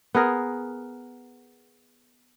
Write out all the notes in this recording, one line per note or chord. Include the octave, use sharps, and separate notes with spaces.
B3 G#4 A#4